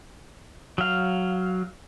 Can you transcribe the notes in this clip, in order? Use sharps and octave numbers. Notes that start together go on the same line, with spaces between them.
F#3 F5